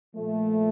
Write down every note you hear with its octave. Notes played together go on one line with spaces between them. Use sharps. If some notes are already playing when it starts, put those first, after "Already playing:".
A#2 F3 A3